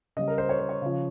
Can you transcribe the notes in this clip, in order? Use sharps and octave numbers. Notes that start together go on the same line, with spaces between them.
C#3 G3 D#5
A#4
C5
C#5
C5
C#5
C#3 F3